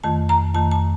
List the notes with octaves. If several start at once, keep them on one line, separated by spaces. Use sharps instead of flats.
F2 D#3 A3 A5
A#5
F2 D#3 A3 A5
A5